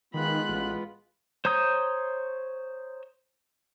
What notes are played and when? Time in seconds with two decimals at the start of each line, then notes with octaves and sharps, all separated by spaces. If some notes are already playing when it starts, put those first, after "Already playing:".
0.14 D#3 G#3 B3 F4 B5 F#6
0.49 A1
1.45 C5 C#5 A#5 D#6 G6